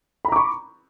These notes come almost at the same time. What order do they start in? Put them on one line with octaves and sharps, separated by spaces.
B5 A#5 D6 C#6